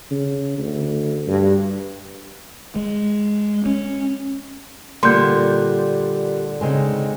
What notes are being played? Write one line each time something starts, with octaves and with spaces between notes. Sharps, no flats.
C#3
D2
G2
G#3
C#4
A#2 D3 G3 A#3 C6 G6
C#3 G#3 C4 D#4